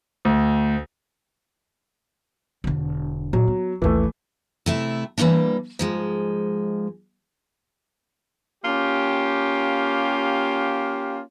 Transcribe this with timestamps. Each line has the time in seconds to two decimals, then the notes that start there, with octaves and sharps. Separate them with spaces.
0.25 D2
2.64 E1 D3
3.33 A#2 F#3
3.48 B3
3.82 A1 D#2 E3 A3
4.66 C3 A3 E4
5.18 E3 G3 A3 A#3 D4
5.79 G#2 F3 G#3
8.65 A#3 C#4 F4 G4